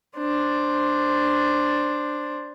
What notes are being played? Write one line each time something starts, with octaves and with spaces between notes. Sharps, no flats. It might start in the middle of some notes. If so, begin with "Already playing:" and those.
D4 C5